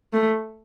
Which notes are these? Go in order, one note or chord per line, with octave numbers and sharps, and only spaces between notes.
A3